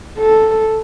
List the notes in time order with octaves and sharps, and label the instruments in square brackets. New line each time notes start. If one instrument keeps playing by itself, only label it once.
[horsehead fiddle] A4